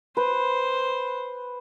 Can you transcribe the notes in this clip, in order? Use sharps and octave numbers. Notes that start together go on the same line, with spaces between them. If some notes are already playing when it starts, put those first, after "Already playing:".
B4 C5